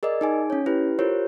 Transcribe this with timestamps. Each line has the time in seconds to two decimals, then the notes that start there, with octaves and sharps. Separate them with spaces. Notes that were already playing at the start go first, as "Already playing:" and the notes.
0.03 G#4 A#4 D5 D#5
0.21 D#4 G#4 G#5
0.50 C#4 C#5
0.66 E4 G4 B4
0.99 F4 G4 A#4 C5 C#5